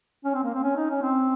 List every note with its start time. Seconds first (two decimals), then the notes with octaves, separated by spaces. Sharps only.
0.25 C#4
0.34 C4
0.44 A#3
0.54 C4
0.63 C#4
0.76 D#4
0.90 C#4
1.02 C4